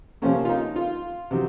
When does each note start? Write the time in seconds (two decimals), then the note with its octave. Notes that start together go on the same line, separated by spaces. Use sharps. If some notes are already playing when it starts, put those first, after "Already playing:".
0.22 C3 F3 A#3 C#4
0.45 F4
0.49 D#4
0.76 F4
1.31 C3 D#3 F#3